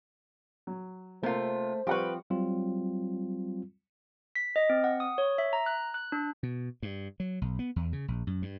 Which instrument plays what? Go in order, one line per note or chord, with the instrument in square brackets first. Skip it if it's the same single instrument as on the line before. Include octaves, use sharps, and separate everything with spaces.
[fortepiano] F#3
[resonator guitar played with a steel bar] C3 F4 [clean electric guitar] A3 [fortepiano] A#3 C6 [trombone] C5
[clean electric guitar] F3 C4 F4 [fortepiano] G3 F#5 C#6 [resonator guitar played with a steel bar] G4 B4
[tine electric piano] F#3 G3 C4 F4
[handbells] B6
D#5
C4
F#5
D#6
C#5
E5
A#5
F#6
F#6
D4
[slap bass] B2
G2
F#3
B1
B3
E2
C#3
A#1
F#2
G2